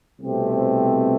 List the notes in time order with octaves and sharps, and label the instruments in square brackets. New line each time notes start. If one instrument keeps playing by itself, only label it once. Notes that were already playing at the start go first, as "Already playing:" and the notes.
[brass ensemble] C2 B2 A3 C4 G4